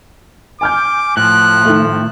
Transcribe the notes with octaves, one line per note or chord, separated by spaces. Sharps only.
G#5 D6 F6 G6
A2 F3 F#6
D#3 A3